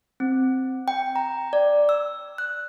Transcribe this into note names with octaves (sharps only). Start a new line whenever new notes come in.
C4
G5
A#5
D5
E6
F#6